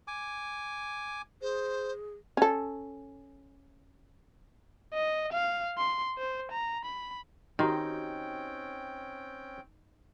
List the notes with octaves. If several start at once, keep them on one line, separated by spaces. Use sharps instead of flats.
G#5 D6
G#4 C5
C#4 A4
D#5
F5
C6
C5
A#5
B5
D#3 C4 C#4 D#4 F#4 G4 G5